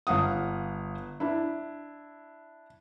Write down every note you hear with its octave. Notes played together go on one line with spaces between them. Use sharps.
G1 F5 F#5 D#6
D4 E4